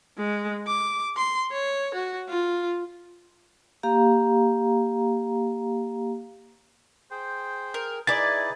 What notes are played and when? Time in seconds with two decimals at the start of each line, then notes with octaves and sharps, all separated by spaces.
0.18 G#3
0.67 D6
1.17 C6
1.52 C#5
1.94 F#4
2.29 F4
3.83 A#3 G4 F5 A#5
7.11 G#4 C5 G5
7.74 A#4
8.07 D#4 E4 G#4 B4 D5 G#5 A6